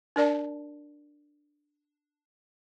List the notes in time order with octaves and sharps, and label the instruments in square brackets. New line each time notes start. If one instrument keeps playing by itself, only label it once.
[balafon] D4 A#4 D5 A5